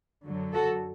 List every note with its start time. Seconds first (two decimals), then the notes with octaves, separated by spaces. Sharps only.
0.25 F#2 D3 F#3
0.53 F#4 A4